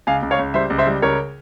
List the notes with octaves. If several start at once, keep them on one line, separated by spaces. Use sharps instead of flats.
C#2 F5 G#5
C#2
C#5 F5
C#2
G3 C5 E5
C#2
C5 E5
G3
C#2 A#4 C#5